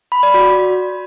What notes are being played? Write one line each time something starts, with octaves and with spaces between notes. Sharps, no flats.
B5
D5
F#4